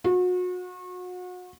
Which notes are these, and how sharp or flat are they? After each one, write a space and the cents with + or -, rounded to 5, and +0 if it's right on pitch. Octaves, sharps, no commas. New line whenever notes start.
F#4 -35